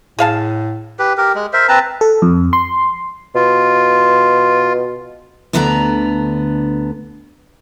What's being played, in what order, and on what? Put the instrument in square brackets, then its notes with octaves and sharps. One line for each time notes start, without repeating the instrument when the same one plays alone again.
[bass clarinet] A2 [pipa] G#4 F5 A5
[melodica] G4 B4
G4 A#4
G#3
A#4 C5 E5
C4 B4 A5 A#5
[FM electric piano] A4
F2
C6
[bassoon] B2 [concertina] F4
[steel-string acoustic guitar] D2 D3 B3 D4 F5 A#5